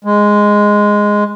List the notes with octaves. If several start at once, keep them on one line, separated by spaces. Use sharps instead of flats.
G#3